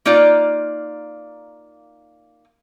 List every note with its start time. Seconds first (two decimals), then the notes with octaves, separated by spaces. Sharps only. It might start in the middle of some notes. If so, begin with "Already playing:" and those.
0.06 A#3 D#4 F4 D5